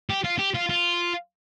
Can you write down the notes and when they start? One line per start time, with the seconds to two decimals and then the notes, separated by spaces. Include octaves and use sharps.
0.10 G4
0.24 F4
0.39 G4
0.55 F4
0.69 F4